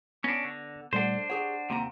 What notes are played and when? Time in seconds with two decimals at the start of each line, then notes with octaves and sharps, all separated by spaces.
0.24 B3 C#4 D4 A#6
0.45 D3
0.93 A#2 G3 A3 D4 A4 C5 D5 F#5
1.30 G4 G#4 C#5 F#5
1.70 D#2 C3 D#3 A#3 A#5